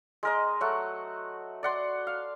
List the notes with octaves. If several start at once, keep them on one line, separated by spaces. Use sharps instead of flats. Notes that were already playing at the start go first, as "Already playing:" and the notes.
G#3 A#4 D#5
F#3 A3 F#4 F#5
D5 F#5 C6
F5